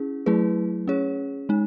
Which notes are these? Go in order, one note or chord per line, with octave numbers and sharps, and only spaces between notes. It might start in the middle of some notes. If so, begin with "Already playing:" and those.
Already playing: C#4 E4 G#4
F#3 A3 E4 G#4 B4
C#4 G#4 C#5
G#3 D#4